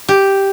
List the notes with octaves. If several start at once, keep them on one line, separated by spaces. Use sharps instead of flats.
G4